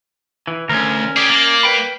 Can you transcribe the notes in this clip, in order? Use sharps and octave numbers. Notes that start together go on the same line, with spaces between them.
E3
D2 C#4 A#4
G4 G#4 D5
A#3
B4 G5 B5